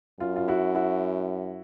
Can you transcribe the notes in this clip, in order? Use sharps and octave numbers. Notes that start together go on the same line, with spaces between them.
F#2 F4
F4
E4 F#4
E4 F#4